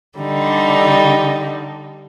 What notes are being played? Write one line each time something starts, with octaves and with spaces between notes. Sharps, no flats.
D3 G3 D#4